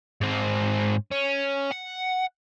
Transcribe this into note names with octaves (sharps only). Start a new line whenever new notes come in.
G#2 C4
C#4
F#5